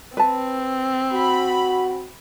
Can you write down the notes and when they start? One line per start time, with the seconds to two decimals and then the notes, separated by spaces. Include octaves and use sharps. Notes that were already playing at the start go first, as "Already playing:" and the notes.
0.17 C4 B4 A5
1.14 F#4 B5